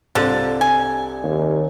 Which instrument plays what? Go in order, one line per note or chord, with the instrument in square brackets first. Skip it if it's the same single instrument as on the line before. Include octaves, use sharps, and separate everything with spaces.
[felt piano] C2 A4 D5 [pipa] D3 F3 A5
[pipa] G#5
[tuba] D#2